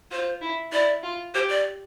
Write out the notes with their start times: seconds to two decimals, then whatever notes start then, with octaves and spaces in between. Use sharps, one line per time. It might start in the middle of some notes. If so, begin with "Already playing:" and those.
0.11 F4 C5
0.42 E4
0.72 E4 D5
1.03 F4
1.34 G4 C5
1.49 D5